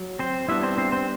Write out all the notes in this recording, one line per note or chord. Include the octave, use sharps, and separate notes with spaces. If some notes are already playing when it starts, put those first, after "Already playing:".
Already playing: F#3
C4 C5
G3 B3 D4 E4 E5
C4 C5
C4 C5
C4 C5